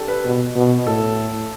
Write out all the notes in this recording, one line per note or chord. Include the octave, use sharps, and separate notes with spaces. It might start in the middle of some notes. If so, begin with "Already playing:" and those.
Already playing: D4 G4 A4
B4
B2
B2
A2 A4